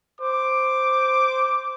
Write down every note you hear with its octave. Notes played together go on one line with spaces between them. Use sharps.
C5 D6